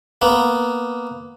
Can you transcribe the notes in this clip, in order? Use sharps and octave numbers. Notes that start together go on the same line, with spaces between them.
A#3 B3